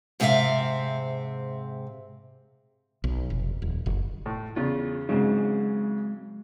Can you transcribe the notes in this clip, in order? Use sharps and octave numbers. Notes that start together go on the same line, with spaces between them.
G#2 C3 C4 G#4 E5 F5
B1
F1
D#1
F#1
A2
E2 C#3 F4
G#2 C#3 F#3 G#3 C4